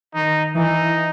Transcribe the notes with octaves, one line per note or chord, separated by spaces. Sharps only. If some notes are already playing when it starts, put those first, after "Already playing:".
D#3 D#4
E3 D#4